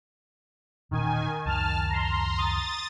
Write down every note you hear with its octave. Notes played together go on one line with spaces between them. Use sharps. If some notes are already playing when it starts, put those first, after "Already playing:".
E1 A#2 D#3 C#4 G#5
C#2 F#2 D#3 A5 F6
A#5 C6
D#6 A6